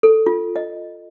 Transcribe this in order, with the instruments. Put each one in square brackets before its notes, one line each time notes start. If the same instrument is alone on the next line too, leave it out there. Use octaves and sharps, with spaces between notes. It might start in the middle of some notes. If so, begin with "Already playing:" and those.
[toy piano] A4
F4
D#5